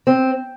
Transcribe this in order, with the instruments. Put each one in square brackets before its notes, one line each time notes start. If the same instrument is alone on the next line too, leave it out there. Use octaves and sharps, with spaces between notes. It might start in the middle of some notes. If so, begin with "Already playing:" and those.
[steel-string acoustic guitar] C4